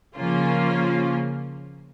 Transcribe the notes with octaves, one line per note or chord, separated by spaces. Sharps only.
C#3 F3 A#3 C#4 F4